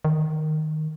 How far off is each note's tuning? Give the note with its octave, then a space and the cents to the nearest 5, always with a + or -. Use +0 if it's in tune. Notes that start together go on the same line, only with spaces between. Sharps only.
D#3 -5